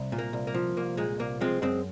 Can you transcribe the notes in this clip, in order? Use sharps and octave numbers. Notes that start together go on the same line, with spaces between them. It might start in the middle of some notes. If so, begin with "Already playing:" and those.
Already playing: C2
A#2
A#3
C2
A#3
F3
C2 A#3
A#2 G#3
C2 A#3
F3 G#3 C4
F#2 G#3 C4